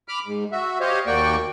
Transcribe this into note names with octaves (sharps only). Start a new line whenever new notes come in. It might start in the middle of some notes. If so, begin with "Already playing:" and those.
B5 D6 F6
G#2
F#4 E5
G4 C5 C#5 D#5 F5
D#2 A#3 F#4 D5 G5 C#6